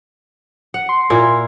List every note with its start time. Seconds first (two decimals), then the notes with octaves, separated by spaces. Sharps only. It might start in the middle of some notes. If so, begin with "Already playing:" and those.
0.74 F#5
0.89 C6
1.10 A#2 E4 A#4